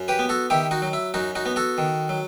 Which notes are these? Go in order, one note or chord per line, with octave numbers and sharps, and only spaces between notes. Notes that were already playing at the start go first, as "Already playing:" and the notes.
Already playing: F#2
G4 B4
B3
F#4 A4
D#3 E4 G4
D#4 F#4
F#3
E4
F#2 D#4 F#4
D#4 F#4
B3
F#4 A4
D#3
F#3